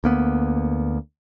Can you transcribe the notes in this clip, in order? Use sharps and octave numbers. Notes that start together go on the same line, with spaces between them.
D2 A#3 B3